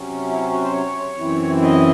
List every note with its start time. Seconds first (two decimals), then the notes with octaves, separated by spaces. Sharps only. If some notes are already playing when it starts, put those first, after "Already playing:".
Already playing: C3 F#3 C#4
0.29 E4
0.51 F#4
0.62 C5
0.72 C#5
1.17 F#2 E3 C4 E4
1.62 D#5